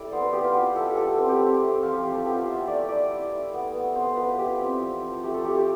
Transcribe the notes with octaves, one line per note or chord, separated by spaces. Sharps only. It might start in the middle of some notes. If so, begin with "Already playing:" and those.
Already playing: E4 G4 A4 D5
B3 C5
B4
B3 G4
F4
B3 G4
E4 A4
G4
A3 A4
C4 B4
G4
C4
A3
F3 F4
G4
F3 G4
A4
B3 G4
F4
E4 E5
E5
A3 D5
E4 D5
E4
E4
B3
B3
B3 C5
F4 B4
E4 G4
C4
F3
F3
A3 G4
A4
A3 G4
G4